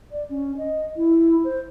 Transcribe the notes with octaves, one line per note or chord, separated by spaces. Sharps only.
D5
C#4
D#5
E4
C5